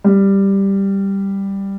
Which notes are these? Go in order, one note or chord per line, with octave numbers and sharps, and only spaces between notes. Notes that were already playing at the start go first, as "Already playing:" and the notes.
G3